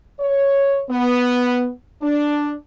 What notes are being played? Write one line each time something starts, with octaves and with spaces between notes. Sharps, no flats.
C#5
B3
D4